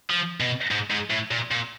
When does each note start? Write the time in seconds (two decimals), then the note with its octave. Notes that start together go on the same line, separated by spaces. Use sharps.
0.10 F3
0.40 B2
0.71 G#2
0.90 G#2
1.10 A2
1.31 A#2
1.51 A#2